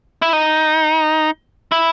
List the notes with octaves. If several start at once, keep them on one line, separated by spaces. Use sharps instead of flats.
E4
D#4
E4